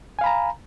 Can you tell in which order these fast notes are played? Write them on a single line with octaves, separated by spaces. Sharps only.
G#5 F5 B5 A#5